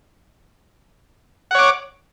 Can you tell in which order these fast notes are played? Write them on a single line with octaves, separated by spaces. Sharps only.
F#5 C#5 D6